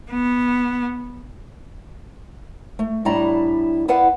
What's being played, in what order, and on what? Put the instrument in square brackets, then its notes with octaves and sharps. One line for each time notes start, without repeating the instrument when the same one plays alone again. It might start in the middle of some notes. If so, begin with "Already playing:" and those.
[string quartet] B3
[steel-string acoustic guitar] A3
A2 G3 D4 E4 A#5
B3 E4 B4 D5 F5 F#5